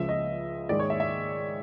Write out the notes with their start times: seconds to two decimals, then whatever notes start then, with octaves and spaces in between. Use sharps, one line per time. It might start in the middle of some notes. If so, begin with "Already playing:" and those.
Already playing: C#2 C#3 F3 E5
0.09 D#5
0.69 G#2 D#3 G#3 D5
0.79 C#5
0.90 E5
1.00 E5